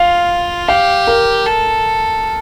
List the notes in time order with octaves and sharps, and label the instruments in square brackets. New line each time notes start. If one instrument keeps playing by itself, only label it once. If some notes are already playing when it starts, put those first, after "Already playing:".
Already playing: [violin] F4 [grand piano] F5
[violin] G4 [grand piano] F5
[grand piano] A#4
[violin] A4